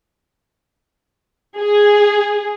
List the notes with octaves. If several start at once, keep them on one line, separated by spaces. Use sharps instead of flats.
G#4